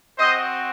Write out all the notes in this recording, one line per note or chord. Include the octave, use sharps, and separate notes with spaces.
C4 F#4 C5 D#5